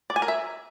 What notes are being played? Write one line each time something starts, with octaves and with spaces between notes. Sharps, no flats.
D5
G#5
A#4
E5